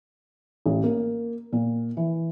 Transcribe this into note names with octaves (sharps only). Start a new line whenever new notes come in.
A1
A#3
A#2
E3